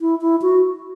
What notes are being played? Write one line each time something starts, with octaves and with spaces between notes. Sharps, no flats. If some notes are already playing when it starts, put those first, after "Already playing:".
E4
E4
F#4